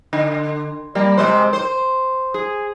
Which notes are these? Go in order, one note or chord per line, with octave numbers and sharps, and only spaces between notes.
D3
G3 A#3
C3 G#3 C5
C5
G#4